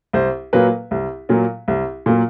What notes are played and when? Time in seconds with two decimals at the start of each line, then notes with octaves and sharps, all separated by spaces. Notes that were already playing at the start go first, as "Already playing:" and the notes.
0.13 C2 C5
0.53 A#2 F#3 A#3 B4
0.91 C2
1.29 A#2 F#3 A#3
1.68 C2
2.06 A#2 F#3 A#3